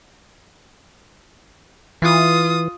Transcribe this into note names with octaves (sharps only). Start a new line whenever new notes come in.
E3 F4 D#6